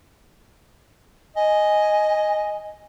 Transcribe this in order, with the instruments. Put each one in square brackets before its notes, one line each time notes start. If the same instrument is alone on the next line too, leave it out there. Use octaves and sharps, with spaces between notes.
[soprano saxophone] D#5 [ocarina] G#5